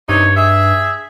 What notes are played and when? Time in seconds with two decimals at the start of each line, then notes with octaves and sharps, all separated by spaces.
0.09 G2 C3 D#4 C#5
0.37 G#4 E5